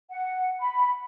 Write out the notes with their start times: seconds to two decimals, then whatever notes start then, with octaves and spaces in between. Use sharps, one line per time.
0.11 F#5
0.61 B5